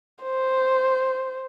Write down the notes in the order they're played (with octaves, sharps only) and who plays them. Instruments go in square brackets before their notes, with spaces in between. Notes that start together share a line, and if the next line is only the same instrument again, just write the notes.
[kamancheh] C5